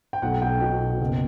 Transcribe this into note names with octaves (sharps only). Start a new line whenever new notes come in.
G5
B1 F#5
B1 G5
B2
B2
F#1